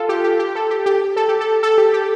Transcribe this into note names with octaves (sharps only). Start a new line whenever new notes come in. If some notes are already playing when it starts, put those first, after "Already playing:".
Already playing: F4 A4
G4
G4
G4
A4
G4
G4
A4
G4
A4
A4
G4
G4